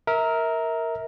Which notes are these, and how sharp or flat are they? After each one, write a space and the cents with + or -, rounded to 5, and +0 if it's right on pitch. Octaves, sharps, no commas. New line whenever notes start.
A#4 +0 E5 -30